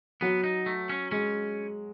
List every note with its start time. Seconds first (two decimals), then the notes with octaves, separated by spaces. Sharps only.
0.21 F#3 B3
0.44 D#4
0.66 A3
0.89 C#4
1.11 G#3 C#4